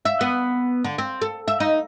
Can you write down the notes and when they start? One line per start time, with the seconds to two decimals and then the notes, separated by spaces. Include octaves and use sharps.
0.05 E5
0.21 B3
0.84 D3
0.98 C4
1.22 A4
1.48 E5
1.60 D#4